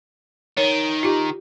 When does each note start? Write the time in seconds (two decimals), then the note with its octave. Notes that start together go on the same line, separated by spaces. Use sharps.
0.57 D#3 C#5
1.03 F4 G4